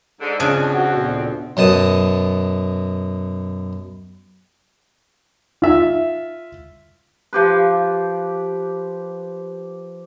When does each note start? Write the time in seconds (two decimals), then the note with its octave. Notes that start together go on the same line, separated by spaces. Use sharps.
0.21 G#2 D3
0.40 F2 C#3 C4 D4 G#5
0.75 F#4
0.96 D2 A#2 B3
1.57 F#2 B2 A5 D#6
5.62 F4 E5
7.33 F3 G4 B4